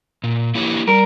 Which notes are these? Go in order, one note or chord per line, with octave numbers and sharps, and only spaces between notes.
A#2
A#3 E4 G4 C#5
G3 A#4